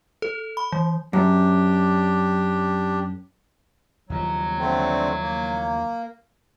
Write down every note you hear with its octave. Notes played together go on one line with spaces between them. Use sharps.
A4
B5
E3
F#2 D4 G4
D#2 C#3 F3 F#3
D3 A3 C4
A#3